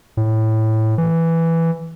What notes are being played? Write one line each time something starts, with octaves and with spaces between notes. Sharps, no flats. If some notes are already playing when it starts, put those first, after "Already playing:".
A2
E3